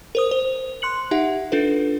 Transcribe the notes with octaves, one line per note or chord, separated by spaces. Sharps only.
A#4 C5 D#6
C5
C6 F#6 C#7 F#7
D#4 G4 E5 F#5
D4 F4 A4 B4